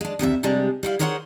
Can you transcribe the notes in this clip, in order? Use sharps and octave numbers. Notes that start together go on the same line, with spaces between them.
G#3 D4
D2 C3 G#4 E5
C3 G3 G#3 D4
G3 E4 F5
G#4 A#4 C5 C#5 F5 F#5